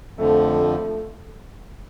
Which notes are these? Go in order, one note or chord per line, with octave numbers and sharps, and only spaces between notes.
F2 D3 F3 A3
A3